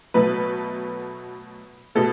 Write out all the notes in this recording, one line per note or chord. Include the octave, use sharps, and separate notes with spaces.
B2 F#3 A3 B4
B2 A3 A4